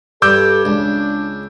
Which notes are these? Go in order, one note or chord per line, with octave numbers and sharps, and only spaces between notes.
G2 A4 D6 E6 G6
C#2 D4